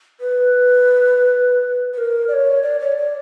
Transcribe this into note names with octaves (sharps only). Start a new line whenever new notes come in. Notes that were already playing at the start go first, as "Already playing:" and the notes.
B4
B4
A#4
D5
C#5
D5
C#5
D5